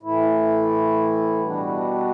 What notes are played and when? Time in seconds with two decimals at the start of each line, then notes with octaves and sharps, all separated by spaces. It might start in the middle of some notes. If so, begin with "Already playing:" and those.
0.03 A2 E3 A3 E4
1.40 B2 G3 D4 F#4